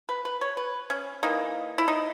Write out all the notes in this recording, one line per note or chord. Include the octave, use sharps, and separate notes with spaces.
B4
B4
C#5
B4
C#4
E3 A#3 D#4
E4
D#4